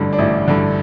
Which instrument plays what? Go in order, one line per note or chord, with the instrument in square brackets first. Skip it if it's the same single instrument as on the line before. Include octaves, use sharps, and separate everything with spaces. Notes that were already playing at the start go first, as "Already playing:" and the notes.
Already playing: [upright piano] A1 G2 D3 D4
D4
A1 E4
G2 D3